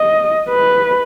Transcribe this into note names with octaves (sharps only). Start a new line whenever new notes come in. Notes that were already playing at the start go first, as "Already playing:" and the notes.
Already playing: D#5
B4